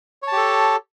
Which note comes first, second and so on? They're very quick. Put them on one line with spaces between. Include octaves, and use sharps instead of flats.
C#5 A5 G4 A4